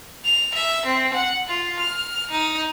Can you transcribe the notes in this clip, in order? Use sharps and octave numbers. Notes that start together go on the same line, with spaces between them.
F7
E5
C4
F#5
F4
F6
D#4